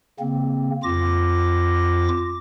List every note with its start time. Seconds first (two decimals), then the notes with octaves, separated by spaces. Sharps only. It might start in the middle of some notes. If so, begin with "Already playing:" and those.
0.20 C#3 A#3 C4
0.83 F2 F4 D6 A#6